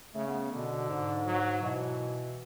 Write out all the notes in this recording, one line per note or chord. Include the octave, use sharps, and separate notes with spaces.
C#3 A3
B3
B2 D3
G#2
F#3
B2 E3